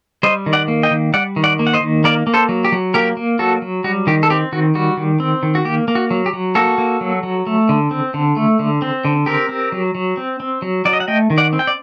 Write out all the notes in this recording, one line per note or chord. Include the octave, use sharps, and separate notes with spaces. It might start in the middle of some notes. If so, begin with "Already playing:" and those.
G3 C5 D#5
D#3
D5 F#5
A#3
D#5 G5
D#3
G3 D5 F#5
D#3
D5 F#5
A#3
F#5
C5 D#5
D#3
A#3 A#4 D5
A#3
A4 C5
F#3
G4
F#3
A#3 G4 A#4
A#3
F#3 F#4 A4
F#3
G3 F#4
D#3 G4
A4
C4 G4
D#3 F#4
G3 F#4
D#3
C4
D#3
F#4
A#3 G4
A#3
F#4
F#3
G4
F#3
A#3 F#4 A4
A#3
F#3
F#3
A3
D3
C4
D3
A3
D3
C4
D3
C4 G4 A#4
C4
F#3
F#3
C4
C4
F#3
F#3 D5
D#5
F#5
A3 D#5 G5
D#3
D5 F#5
C4
G5
D5